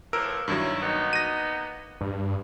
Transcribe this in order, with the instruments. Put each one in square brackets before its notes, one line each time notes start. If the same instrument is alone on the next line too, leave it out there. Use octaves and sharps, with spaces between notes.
[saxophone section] A2 E3 F3 [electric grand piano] A#4 E6 D7
[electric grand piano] G2 D#3 F#3 [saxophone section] C#4 E4
[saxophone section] A#3 B3 D#4
[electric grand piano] A#6 D#7
[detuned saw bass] G2